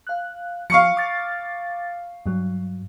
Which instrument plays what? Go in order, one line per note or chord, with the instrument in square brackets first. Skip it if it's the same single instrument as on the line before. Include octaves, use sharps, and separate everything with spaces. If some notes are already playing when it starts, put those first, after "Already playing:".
[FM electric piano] F5 F#6
[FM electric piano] F3 [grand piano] F5 C#6 C#7
[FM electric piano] D6 A6
G2 F#3